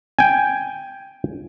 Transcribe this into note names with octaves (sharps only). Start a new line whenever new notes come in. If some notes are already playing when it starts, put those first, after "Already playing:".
G5 G#5